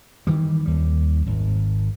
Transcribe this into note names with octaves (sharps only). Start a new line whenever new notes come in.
D#3 E3 G3
D#2 G3
G#1